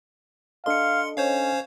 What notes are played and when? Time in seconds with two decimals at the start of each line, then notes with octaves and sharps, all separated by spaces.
0.66 D4 A4 D#5 F5 C6 C#7
1.17 C#4 C5 C#5 F5